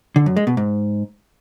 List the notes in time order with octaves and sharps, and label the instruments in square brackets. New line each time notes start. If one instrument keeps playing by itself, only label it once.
[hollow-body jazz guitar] D3
F#2
G#3
B2
G#2